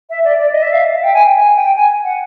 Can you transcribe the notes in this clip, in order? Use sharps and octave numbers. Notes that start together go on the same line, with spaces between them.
E5
D5
D5
D#5
E5
F5
E5
G5
G#5
G5
G#5
G5
G#5
F#5